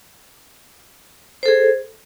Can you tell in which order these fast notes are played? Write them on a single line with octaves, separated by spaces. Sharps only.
C5 A4 G#4